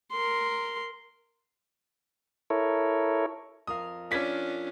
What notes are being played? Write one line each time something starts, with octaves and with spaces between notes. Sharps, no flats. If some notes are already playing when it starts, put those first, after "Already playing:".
A#4 C6
E4 A4 A#4 C#5
F2 A#4 F5 D#6
C#4 D4 F4 D5 G#6 B6